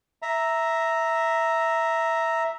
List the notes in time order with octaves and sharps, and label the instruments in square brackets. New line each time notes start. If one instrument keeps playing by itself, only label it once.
[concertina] E5 A#5